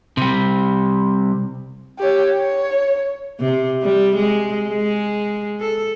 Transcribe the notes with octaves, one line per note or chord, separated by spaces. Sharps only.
C3 G3
G4 C#5
C#5
C3
G3
G#3
G#3
A4